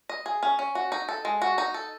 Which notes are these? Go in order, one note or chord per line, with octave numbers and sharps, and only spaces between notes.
D#5
G#4
C#4
C#4
F#4
D#4
A4
G#3
F#4
D#4
A4